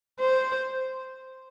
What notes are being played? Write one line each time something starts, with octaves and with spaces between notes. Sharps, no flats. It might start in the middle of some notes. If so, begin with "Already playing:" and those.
C5